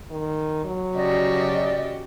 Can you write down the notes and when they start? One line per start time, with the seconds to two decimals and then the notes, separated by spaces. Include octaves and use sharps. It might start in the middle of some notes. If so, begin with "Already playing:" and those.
0.11 D#3
0.65 F#3
0.95 C#3 F#4 G4 D5 D#5